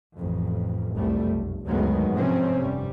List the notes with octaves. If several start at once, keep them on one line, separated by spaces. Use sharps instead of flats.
A1 F2
F1 C2 F#2 G3 A3
B1
D2 G2 D#3 F#3 G#3 B3
F2 G#2 C3 F3 C4 C#4
F1 G2 G3